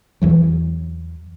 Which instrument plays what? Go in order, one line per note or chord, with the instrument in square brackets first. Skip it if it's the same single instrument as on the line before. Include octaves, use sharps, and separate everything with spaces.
[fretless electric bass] E2 E3 F#3